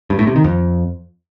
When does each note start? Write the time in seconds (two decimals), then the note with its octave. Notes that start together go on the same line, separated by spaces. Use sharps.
0.10 G2
0.19 A2
0.27 C3
0.36 D#3
0.44 F2